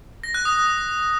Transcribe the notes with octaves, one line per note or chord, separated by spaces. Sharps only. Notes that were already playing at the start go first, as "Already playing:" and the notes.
A#6
F#6
D#6